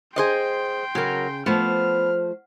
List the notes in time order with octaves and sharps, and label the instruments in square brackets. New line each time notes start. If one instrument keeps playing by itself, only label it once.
[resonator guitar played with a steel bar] G#4 C5 D#5 [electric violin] G5 C6
[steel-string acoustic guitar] C#3 [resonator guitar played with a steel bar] F#3 A#4
[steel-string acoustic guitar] F3 A3 C5 [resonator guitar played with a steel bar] B3 [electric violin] F6